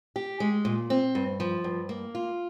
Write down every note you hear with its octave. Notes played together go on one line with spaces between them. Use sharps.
G4
G#3
A#2
C4
G2
F3
G2
A#3
F4